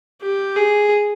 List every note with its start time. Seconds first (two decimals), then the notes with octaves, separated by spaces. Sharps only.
0.22 G4
0.56 G#4